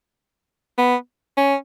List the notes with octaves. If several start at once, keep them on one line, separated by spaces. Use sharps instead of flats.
B3
C#4